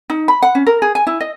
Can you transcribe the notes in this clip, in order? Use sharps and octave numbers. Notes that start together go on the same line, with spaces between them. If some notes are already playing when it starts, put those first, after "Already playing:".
D#4
B5
F#5
C#4
A#4
G#4
G#5
E4
D#5